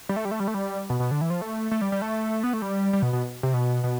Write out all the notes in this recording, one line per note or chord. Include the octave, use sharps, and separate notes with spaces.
G3
A3
G3
A3
G3
A3
G3
B2
B2
D3
E3
F3
A3
A3
G3
G3
A3
B3
A3
G3
G3
B2
B2
C3
B2
B2